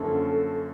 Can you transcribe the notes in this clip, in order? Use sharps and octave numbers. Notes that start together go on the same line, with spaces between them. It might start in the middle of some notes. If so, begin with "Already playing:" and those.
Already playing: F#2 D3 F3 A#3 C#4 A4